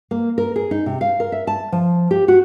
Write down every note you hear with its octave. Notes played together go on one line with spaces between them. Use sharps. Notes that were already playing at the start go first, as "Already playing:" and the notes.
A#3
A#4
G#4
D#4
C3
F5
A#4
E5
A5
F3
G4
F#4